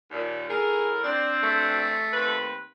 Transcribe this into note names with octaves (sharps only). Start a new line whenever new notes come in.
D#2 A#2
A2 G#4 A#4
C4 D4 D5
A3
D#2 C4 B4